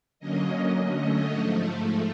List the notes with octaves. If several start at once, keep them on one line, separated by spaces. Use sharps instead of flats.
D3 F#3 A#3 C#4 D#5
D3 F#3 A3 C#4 D#5
G#2 F3 A3